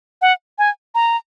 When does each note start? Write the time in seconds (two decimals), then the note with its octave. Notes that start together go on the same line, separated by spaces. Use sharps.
0.22 F#5
0.58 G#5
0.95 A#5